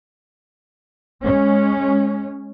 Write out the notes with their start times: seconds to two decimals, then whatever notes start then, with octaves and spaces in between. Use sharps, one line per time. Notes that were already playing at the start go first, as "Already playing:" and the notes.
1.23 G#3 C#4